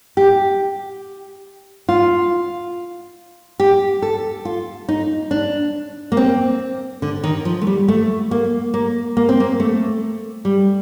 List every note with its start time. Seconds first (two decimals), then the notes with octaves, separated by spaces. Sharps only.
0.17 G4
1.89 F4
3.60 G4
4.02 A4
4.45 F4
4.89 D#4
5.31 D4
6.12 A#3
6.17 C4
7.02 D3
7.24 D#3
7.45 F3
7.62 A3
7.67 G3
7.88 A3
8.31 A#3
8.74 A#3
9.17 A#3
9.29 C4
9.40 A#3
9.60 A3
10.45 G3